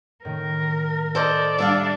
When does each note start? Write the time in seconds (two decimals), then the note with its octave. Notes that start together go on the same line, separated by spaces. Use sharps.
0.25 A2 D#3 A#4
1.15 A4 C5 D5 D#5
1.58 G3 D4 A4 E5 F5